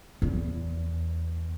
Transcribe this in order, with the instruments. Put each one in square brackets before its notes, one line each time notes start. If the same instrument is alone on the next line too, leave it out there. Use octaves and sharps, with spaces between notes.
[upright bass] E2